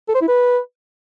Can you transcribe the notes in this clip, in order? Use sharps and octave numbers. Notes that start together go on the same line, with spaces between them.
A4
C5
E4
B4